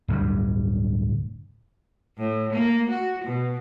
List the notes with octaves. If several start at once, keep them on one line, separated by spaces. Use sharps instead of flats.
D1 G2
A2
A#3
F#4
B2